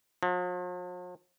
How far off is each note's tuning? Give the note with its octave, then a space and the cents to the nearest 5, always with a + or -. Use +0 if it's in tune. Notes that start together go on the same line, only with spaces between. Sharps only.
F3 +45